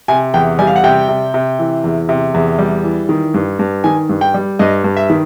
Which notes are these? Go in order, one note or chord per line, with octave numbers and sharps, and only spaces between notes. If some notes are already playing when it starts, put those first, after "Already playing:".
C3 G#5
E2 G5
G3 G#5
F5
F#5
C3 G5
C3
C3
E3
E2
C3
E2
G3
E3
D#3
G2
G2
D#3 G#5
G2
G5
G3
G2 D#5
G2
E5
D#3